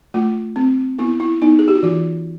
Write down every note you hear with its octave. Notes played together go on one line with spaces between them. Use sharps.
A3 F4
C4
B3 E4
E4
B3 D#4
G#4
G4
F#4
E3 F4